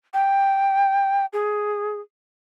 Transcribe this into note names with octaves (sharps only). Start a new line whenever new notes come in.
G5
G#4